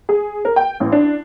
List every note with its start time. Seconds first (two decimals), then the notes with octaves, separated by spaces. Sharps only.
0.09 G#4
0.45 A#4
0.56 G5
0.80 A1
0.92 D4